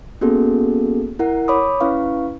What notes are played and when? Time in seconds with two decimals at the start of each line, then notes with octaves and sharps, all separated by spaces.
0.21 A#3 B3 C#4 F#4 G#4 A4
1.19 E4 A#4 F#5
1.48 C#5 B5 D6 D#6
1.80 C#4 E4 B4 F5 C#6